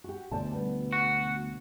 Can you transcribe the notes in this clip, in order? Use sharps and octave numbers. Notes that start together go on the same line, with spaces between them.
F#4 G4
D2 B2 C5 D5 A5
G3 B3
F#4